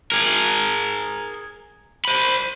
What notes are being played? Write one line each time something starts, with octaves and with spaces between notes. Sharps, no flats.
G#4 A#4
C5 B5